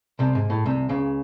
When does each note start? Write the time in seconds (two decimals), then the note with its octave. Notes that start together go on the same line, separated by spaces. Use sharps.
0.19 C2 C3
0.35 G#2
0.50 A2
0.65 C2 C3
0.89 C#2 C#3